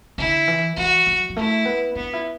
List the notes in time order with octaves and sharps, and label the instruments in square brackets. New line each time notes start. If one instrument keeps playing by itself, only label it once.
[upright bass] D3 [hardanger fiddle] E4
[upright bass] E3
[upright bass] E3 [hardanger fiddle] F#4
[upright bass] F#3
F#3
[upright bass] A3 [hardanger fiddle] E4
[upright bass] B3
[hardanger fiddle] B3 [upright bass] D4
[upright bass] E4